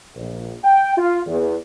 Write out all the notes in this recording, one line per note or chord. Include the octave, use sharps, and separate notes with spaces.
A#1
G5
F4
E2